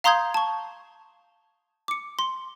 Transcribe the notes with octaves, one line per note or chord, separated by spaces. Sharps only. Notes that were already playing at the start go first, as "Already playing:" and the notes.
F5 A#5 C6 D#6 G6 G#6
A5 C#6
D6 C#7
C6